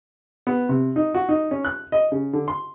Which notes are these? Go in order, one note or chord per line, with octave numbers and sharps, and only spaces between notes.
B3
C3
D#4
F#4
D#4
C#4
F#6
D#5
C#3
D3
C6